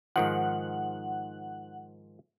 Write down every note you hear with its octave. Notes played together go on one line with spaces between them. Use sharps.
G#2 D#3 F3 F#5